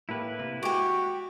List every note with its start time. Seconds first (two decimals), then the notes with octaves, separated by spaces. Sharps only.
0.09 A2 A#3 E4 G4 B4
0.39 C3 A#3
0.63 G#3 F#4 G4 D6